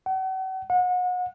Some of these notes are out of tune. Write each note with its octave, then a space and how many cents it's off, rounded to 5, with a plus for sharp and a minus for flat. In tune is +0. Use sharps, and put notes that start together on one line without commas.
F#5 +40
F#5 -35